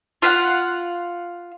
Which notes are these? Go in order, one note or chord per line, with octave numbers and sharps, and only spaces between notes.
F4 F5 F#5